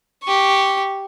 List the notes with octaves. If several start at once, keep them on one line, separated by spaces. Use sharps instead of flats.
G4 C#6